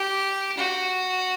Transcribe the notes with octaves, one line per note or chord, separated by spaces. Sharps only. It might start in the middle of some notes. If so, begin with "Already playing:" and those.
Already playing: G4
F#4